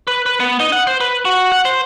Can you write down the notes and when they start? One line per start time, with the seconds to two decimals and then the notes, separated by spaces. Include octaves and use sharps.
0.07 B4
0.26 B4
0.40 B3
0.60 D#4
0.72 F#5
0.87 C5
1.01 B4
1.25 F#4
1.52 F#5
1.65 C5